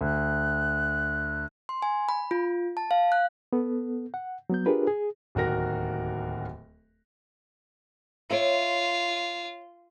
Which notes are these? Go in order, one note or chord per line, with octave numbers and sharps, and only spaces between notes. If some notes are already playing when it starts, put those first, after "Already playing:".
D2 F#6
C6
G#5
B5
F4
A5
F5
F#6
B3 A4
F#5
F#3 B3 G6
D4 F4 G4 G#4 A#4 B4
G#4
D1 D#2 F#4 A#4 A#6
F4 C#5 E5